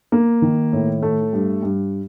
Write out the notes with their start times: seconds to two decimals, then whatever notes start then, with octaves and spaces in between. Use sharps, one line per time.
0.12 A#3
0.42 D#3
0.72 A2
1.03 A3
1.33 G2
1.63 G2